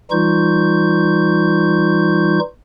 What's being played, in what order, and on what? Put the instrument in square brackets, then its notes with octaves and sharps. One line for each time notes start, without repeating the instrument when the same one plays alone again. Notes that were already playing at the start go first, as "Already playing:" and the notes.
[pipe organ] E3 G3 D#4 F4 C#6 G6